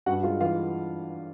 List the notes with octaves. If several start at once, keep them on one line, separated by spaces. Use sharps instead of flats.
G2 F#4 F#5
G#3 F4 F5
E3 F4 F5